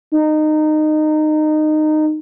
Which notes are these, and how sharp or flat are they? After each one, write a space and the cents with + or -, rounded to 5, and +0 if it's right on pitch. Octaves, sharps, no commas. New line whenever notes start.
D#4 -20